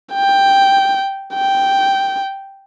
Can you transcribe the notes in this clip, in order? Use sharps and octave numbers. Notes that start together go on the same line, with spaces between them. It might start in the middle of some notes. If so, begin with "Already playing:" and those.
G5
G5